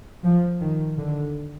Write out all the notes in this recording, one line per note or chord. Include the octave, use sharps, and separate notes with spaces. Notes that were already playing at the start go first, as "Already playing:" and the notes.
F3
D#3
D3